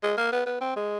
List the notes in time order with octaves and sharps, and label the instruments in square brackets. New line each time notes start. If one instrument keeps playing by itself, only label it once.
[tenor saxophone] G#3
A#3
B3
B3
C4
G#3